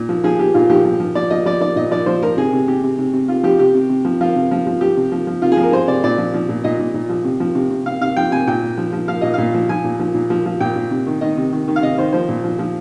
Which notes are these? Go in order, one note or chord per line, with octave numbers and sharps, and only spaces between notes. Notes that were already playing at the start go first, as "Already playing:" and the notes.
Already playing: A#2
F3
F3 G#4
F3 G4
A#2 F4
F3 G4
F3
F3
F3 D5
F3 D#5
F3 D5
F3 D5
A#2 D#5
F3 D5
F3 C5
F3 A#4
C3 G#4
C3
C3 G4
C3
C3
C3
C3 F4
F3 G4
C3 G4
C3
C3
F3
F3 F4
C3
F3
F3
F3 G4
C3
F3
F3
C3 F4
G#4
F3
A#4
F3 C5
C3 D5
A#2 D5
F3
F3
A#2
A#2 D#5
A#2
A#2
F3
C3
F3
C3
C3
C3 F5
C3 F5
F3 G5
C3 G#5
A#2 G5
A#2
F3
F3
F3 F5
A#2 D#5
A#2 F5
F3
F3 G#5
A#2
F3
A#2
F3
F3
A#2 G5
A#2
C3
D#3
D#3 D#5
C3
D#3
D#3
F5
C3 D#5
D#3 C5
F3 C5
A#2
F3
F3